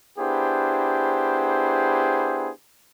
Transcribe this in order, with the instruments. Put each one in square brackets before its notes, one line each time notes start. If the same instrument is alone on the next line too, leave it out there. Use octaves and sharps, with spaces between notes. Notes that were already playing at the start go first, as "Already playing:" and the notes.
[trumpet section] B3 D4 E4 G4 G#4 C5